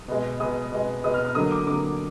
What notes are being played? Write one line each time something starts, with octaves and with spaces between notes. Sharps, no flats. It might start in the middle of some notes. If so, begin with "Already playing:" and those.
Already playing: D#6
B2 G#3
B2 G#3 D#6
B2 G#3
B2 G#3 D#6
F6
F6
D3 F#3 A#3 D#6
D6
D3 F#3 A#3 D6